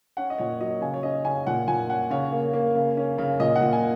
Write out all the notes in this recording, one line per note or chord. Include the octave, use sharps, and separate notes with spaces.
C#4 F#5
D#5
A#2 C#5
F#3 D#5
C#3 G#5
C#5
C#4 D#5
C#3 G#5
A#2 F#5
A#2 G#5
C#4 F#5
C#3 C#5
A#3
A#3
C#3
C#4
C#3
A#2 D#5
F#5
A#2
G#5